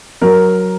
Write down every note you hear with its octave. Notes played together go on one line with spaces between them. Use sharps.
F#3 A#4